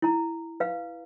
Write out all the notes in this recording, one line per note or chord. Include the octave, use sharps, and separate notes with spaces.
E4 A#5
B4 F5